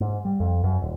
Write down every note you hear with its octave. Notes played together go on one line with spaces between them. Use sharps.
G#2
G3
F2
F#2
D#1